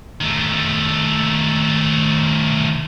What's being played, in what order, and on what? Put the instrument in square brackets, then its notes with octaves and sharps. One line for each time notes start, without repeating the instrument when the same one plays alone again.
[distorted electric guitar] D#3 A3